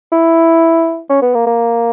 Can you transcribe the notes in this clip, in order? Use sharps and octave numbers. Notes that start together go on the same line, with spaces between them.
E4
C#4
B3
A#3
A#3